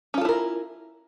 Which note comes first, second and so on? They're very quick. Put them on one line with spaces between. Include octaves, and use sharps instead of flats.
C#4 F4 A4 E4 A#4